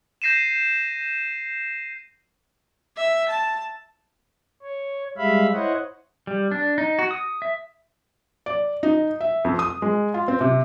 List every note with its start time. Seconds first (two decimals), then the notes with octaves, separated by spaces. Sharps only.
0.22 G6 A#6 C7 D#7 E7
2.97 E5
3.29 A5
4.62 C#5
5.18 G3 G#3 E5 F5 B5
5.53 E4 C5 C#5 D#5 F#5
6.27 G3
6.51 D4
6.78 D#4
6.99 F#4
7.11 D#6
7.42 E5
8.46 D5
8.83 D#4
9.21 E5
9.45 F2
9.59 D#6
9.82 G#3
10.14 F4
10.28 C4
10.41 C3